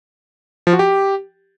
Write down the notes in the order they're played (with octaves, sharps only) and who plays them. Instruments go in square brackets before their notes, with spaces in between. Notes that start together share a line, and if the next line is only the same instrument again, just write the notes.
[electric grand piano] F3
F#4
G4